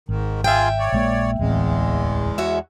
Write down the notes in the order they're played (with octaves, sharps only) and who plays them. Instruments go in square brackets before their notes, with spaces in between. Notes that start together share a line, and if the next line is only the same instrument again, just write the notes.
[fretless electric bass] G#1 [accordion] G#2 D#3
[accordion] F4 G#4 [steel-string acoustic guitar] E5 G5
[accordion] C#5 D5
[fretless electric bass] A#1 G#3 A#3
[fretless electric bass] D1 A1 C4 [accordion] E2 G#3
[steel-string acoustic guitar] F#4 C#5 E5